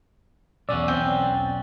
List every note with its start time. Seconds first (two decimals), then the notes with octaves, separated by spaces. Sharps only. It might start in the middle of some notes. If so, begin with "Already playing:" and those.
0.69 B1 E2 C#4 F#4 D5 E6
0.88 C4